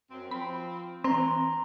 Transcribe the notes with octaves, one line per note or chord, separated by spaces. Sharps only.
F#2 C4
F3 C4 B5
E3 C4 A#5 C6